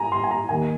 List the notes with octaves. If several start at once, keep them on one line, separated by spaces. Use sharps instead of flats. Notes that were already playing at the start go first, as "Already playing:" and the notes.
Already playing: G#5 A#5
C6
G#5
A#5
D#2 D#3 A#3 G#5